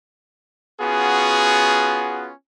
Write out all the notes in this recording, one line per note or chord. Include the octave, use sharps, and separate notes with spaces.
B3 C#4 F4 F#4 G#4